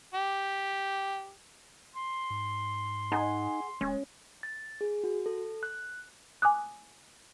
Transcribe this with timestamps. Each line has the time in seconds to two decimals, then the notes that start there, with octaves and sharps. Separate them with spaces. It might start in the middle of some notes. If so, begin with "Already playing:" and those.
0.14 G4
1.95 C6
2.30 G#2
3.12 D#4 G#4 F#5 G#5
3.81 D1 G#3 C#4
4.43 A6
4.81 G#4
5.04 F#4
5.26 A4
5.63 F#6
6.42 G#5 D6 D#6 F#6